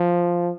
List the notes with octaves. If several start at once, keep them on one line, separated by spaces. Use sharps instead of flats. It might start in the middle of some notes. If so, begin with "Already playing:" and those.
Already playing: F3